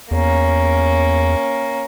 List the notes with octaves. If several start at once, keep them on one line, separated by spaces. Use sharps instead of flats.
E2 A#3 C#4